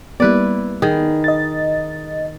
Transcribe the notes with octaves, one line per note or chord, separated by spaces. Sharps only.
G3 A#3 B3 E4 B4 D5
D#3 G#4
D#5 A6